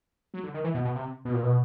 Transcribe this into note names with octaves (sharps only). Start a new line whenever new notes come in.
F#3
D3
D#3
E3
B2
B2
C3
B2
A#2
B2